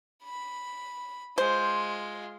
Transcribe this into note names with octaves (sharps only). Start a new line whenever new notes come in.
B5
G#3 F4 C5